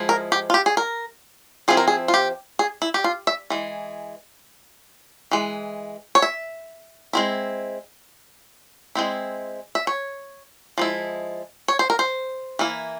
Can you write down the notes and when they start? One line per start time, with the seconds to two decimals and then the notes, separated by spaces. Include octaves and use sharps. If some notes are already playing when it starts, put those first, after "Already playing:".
Already playing: F3 G#3 E4
0.09 A#4
0.32 G4
0.50 F4
0.54 G4
0.66 G#4
0.77 A#4
1.68 F3 C4 E4 G#4
1.77 A#4
1.88 G#4
2.08 F4
2.14 G4
2.59 G#4
2.82 E4
2.94 G4
3.04 F4
3.27 E5
3.50 E3 G#3
5.31 E3 G#3
6.15 C#5
6.22 E5
7.13 G#3 C4 E4
8.95 G#3 C4 E4
9.75 E5
9.87 C#5
10.78 F3 G#3 E4
11.68 C#5
11.79 C5
11.90 A#4
11.99 C5
12.59 E3 A#3 E4